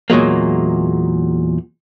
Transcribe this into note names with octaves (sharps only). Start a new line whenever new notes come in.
E2 A#2 F#3 G#3 A#3